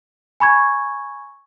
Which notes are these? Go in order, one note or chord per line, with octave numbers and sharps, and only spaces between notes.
G#5 B5 C#6 G#6